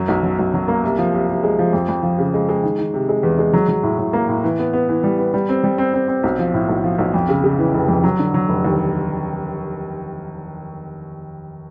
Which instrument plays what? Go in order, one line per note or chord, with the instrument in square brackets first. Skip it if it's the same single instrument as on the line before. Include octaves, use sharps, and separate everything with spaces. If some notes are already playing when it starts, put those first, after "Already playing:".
Already playing: [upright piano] F#2 F#3
B1
F#3
B1
F#3
A#3
C2
F3
C2
C2
G#3
F3
F2
F2
F3
C#3
G#3
G#3
D#3
D#3
C3
G#3
E2
G#3
F#3
F#3
A2
A2
A#3
A2
E3
B3
B3
E3
G3
B3
G3
C4
G3
C4
C4
C4
B1
F3
A2
B1
F3
B1
F2
C#3
C#3
E3
F1
F2
F#3
D3
F#3
F1
D#2